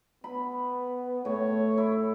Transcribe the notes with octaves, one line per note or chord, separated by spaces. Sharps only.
B3 B5
A2 C#5
E4